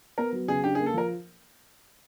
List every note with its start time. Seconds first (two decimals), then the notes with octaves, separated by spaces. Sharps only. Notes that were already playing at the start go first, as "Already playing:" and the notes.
0.18 B3 A#4
0.32 F#3
0.48 C#3 G#4
0.64 D4 G4
0.75 G#4
0.79 A#3
0.86 A4
0.94 F3 A#4